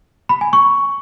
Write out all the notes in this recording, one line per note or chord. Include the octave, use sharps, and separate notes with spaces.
B5
G#5
C#6